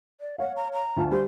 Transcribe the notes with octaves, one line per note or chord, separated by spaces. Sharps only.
D5
C#5 F5 F#5
A#5
A#5
D2 F4 A5
G3 C5